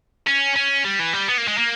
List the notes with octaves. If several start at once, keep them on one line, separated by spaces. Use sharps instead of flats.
C#4
C#4
G3
E3
G3
B3
A#3
G#3
A#3